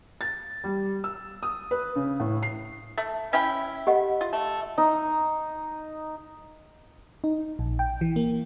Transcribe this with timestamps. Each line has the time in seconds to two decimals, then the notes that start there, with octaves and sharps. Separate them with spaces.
0.21 A6
0.64 G3
1.04 E6
1.43 D#6
1.71 B4
1.96 C#3
2.20 A2
2.43 C7
2.97 A3
3.33 C#4 E4 G5
3.87 G4 D#5 F#5
4.21 F4
4.33 A3
4.78 D#4
7.24 D#4
7.59 A#1
7.79 G5
8.01 E3
8.16 A#3